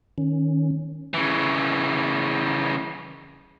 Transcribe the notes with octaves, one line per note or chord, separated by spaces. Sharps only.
D#3 C#4
C#3 E3